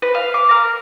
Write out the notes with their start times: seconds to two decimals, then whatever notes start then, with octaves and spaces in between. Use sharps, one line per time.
0.02 B4
0.15 F5
0.34 D6
0.51 A#4